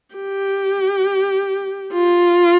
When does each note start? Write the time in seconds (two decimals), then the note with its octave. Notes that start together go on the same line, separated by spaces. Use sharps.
0.15 G4
1.93 F4